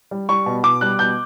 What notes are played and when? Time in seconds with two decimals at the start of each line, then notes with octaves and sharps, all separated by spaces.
0.11 G3
0.29 G3 C#6
0.46 B2
0.63 B2 D6
0.81 G3 F#6
0.99 B2 G6